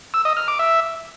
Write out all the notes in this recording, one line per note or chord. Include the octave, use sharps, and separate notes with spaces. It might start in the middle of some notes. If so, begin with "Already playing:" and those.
E6
D#5
F6
D6
E5